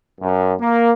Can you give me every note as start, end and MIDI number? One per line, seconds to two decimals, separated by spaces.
0.21 0.53 42
0.60 0.91 58